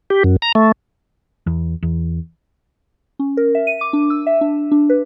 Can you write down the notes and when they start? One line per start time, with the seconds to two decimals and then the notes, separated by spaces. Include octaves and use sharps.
0.10 G4
0.24 F#2
0.42 A#5
0.55 A3
1.47 E2
1.83 E2
3.19 C#4
3.37 A#4
3.55 E5
3.67 D#7
3.81 D6
3.93 D4
4.10 E6
4.27 E5
4.41 D4
4.72 D4
4.90 B4